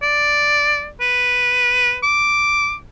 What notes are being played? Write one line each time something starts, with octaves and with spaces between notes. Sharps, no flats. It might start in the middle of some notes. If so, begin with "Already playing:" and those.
D5
B4
D6